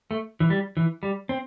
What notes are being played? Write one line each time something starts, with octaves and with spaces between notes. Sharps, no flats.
A3
E3
G3
E3
G3
C4